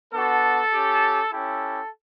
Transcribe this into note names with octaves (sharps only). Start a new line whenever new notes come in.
B3 D4 F#4 A4
C#4 G4
C#4 E4 G4 A4